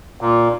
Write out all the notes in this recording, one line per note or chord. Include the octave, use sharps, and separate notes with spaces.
A#2